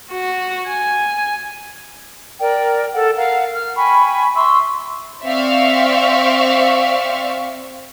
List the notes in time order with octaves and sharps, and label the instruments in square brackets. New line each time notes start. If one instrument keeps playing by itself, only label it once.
[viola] F#4
G#5
[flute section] A#4 D5 G5
A4 F#5
A#4 F5 F#5
F6
G5 G#5 B5 C#6
E5 C6 C#6 E6
[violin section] C4 D5 E5 F5 C#6